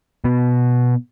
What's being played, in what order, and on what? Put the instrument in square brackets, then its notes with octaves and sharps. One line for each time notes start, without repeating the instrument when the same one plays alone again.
[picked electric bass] B2 B3